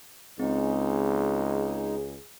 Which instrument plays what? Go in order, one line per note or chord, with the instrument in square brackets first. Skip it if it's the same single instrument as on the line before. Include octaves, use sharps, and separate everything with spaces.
[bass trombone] C#2 [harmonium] G#3 D#4 [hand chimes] C4 [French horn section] G#4